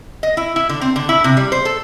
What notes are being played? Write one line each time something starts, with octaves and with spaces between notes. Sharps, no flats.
D#5
E4
E4
D3
C4
D3
E4
C3
G3
C5
A4